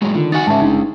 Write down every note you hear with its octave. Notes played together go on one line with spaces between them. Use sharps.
A2 F#3 G#3
D3 D#3 F4
D#4 F#4 F#5 G#5 A6
G#2 G#3 C#4 E5 A5
G1 D4 D#4